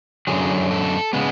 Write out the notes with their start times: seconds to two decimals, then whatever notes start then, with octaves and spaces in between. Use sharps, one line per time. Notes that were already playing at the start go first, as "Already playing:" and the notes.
0.27 F#2 D3 F#3 G#4
0.71 A4
1.13 C#3 G#3 B3